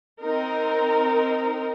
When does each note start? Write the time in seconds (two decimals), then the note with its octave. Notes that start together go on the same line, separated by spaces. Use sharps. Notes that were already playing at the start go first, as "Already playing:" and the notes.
0.21 C4 D#4 A#4